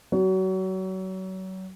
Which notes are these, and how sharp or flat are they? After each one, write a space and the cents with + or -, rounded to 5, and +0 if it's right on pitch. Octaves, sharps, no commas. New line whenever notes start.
F#3 +30